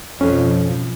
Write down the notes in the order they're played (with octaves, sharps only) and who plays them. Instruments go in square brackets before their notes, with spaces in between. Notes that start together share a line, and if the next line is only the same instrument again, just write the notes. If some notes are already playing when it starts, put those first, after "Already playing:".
[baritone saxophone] F2 [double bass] B2 F3 [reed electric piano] C#4